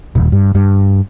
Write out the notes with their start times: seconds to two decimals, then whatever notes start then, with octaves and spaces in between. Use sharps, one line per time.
0.15 D#1
0.32 G2
0.55 G2